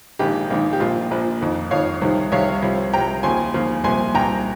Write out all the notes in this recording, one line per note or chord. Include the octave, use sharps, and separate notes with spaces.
A#1 G#2 D#3 G4
A#1 G#2 D#3
G4
A#1 A#2 F3 F4
A#1 A#2 F3
F2 D#3
F2 D#3 C#5 F5
C2 C3 D#3
C2 C3 D#3 C#5 F5
C2 C3 F3
C2 C3 F3 G5 A#5
D#2 C#3 F3 G#5 C6
D#2 C#3 F3
C2 A#2 F3 G#5 C6
C2 A#2 F3 G5 A#5